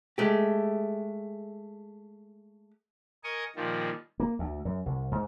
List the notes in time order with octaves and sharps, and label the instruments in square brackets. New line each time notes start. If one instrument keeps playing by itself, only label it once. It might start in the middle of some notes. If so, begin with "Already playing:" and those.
[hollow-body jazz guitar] G#3 A3 G4
[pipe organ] A#4 D#5 G#5 C#6 D#6
A#2 D#3 F3 G3
[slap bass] A#3
D2
F#2
C2
G#2